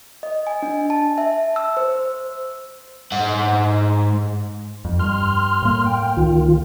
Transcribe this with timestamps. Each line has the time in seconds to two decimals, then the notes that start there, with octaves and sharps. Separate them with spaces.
0.23 D#5
0.47 G#5
0.62 D4
0.90 A5
1.18 E5
1.56 E6
1.77 C5
3.12 G#2 F#5
4.85 F2
4.99 G2 C6 F6
5.62 A2 A#3
5.85 G5
6.17 C#2 D#3 F4